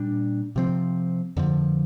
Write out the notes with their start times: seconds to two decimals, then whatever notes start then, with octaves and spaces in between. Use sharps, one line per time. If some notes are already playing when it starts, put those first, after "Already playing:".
Already playing: A#2 G3 D4
0.56 C3 F3 C4
1.37 F2 D3 F3